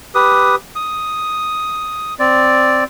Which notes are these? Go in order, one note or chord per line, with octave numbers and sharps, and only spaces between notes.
G4 B4 D#6
D#6
C4 D5